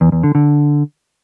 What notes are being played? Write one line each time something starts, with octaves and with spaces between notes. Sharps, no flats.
E2
E2
D3
D3